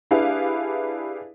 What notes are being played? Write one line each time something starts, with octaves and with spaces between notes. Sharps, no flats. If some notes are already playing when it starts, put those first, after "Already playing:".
D4 E4 G4 G#4 B4 F5